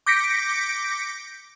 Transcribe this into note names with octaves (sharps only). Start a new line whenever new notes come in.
D6 G6 A#6 B6 C#7 D7